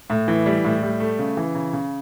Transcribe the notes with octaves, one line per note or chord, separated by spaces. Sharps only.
A2
E3
G3
A2
G3
A3
C#3
E3
C#3
C#3